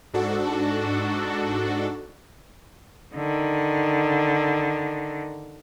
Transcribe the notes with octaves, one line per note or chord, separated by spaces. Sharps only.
G#2 D4 F#4 A4
D3 D#3